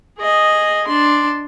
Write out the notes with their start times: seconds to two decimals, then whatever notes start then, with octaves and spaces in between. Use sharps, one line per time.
0.18 G#4 D#5
0.87 D4 C6